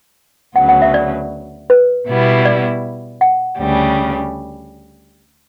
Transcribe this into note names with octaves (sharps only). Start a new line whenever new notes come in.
D2 C#3 F#3 B3 F#5
F#5
E5
D5
B4
B2 G3 B3 E4
D5
F#5
D2 C#3 G3